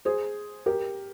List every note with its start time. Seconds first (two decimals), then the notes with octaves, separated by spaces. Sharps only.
0.05 G#4 C5
0.66 G4 A#4